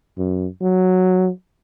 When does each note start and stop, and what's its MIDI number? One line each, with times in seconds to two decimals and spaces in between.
0.18 0.47 42
0.62 1.29 54